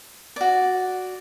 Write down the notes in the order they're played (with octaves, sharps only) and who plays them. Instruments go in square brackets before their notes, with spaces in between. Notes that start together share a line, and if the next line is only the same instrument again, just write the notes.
[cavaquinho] F#4 D5